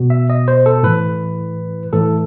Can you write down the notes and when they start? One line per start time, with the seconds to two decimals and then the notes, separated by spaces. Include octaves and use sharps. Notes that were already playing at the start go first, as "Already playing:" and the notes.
Already playing: B2
0.10 E5
0.30 D#5
0.48 C5
0.66 A4
0.83 A2 E3 B4
1.92 A2 E3 A4